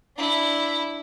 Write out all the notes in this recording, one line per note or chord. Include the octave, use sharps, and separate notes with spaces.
D4 E4